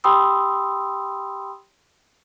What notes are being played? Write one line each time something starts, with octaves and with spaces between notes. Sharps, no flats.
G4 G5 B5 C6 D#6 E6